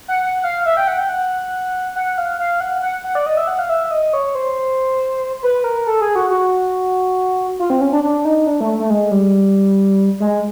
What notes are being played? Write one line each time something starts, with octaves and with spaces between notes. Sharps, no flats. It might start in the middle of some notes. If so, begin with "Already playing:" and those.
F#5
F#5
F5
E5
G5
F#5
G5
F#5
F#5
F5
F5
F#5
F#5
F#5
D5
D#5
E5
F#5
F5
E5
D#5
C#5
C5
B4
A#4
A4
G#4
F#4
F#4
F4
C4
C#4
D4
D4
D#4
D4
A3
A3
G#3
G3
G#3